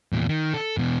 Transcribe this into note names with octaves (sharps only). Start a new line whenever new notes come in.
E2 A#2
D#3
A4
E2 B2